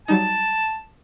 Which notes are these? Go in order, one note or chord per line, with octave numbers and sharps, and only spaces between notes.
F#3 G3 D#4 A5